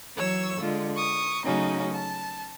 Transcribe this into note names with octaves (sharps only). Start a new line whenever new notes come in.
E3 F#3 C#5 C#6 E6
D3 G#3 F4
C#6 D#6
C#3 F#3 A3 C#4 D#4 F#4
A5